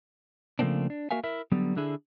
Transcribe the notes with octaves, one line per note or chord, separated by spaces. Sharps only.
C#3 F3 A3 A#3 C4 D4
D4
A#3 F#4 A#4 E5 F5 G#5
E4 A#4 E5
D3 F#3 G3 B3
D3 D4 E4 G#4